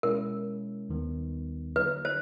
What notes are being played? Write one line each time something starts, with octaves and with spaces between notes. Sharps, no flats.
B2 G#3 C#4 E4 A#4
D#2 D#3 G3 B3
D3 F#3 A#3 D#4 B4
C5